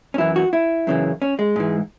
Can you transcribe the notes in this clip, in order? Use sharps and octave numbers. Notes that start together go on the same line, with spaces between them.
C#4
F#2 E3 E4
F#4
E4
F#2 C#3 E3
C#4
G#3
G#2 E3